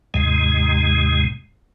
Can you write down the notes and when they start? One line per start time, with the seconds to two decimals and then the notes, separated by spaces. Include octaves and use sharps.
0.14 D#2 G#2 C3 G#3